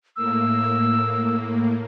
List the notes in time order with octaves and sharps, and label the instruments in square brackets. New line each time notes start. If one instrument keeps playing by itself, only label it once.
[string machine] A2 A#3 [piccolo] E6